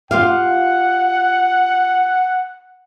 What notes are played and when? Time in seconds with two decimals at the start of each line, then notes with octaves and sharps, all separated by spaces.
0.11 F4 G4 F5 F#5